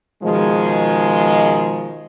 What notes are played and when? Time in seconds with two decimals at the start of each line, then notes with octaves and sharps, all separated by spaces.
0.23 B2 D#3 F3 G#3